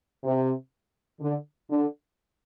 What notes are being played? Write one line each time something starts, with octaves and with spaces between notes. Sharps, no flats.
C3
D3
D3